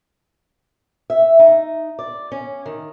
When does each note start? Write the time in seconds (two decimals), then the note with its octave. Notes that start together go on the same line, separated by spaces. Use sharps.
1.10 E5
1.39 D#4
1.99 D5
2.32 C#4
2.66 D#3